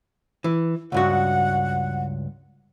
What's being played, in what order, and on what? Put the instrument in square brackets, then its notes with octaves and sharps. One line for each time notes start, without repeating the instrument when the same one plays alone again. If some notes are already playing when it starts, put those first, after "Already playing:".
[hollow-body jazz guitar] E3
[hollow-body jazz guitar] C#2 G2 F#4 [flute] F#5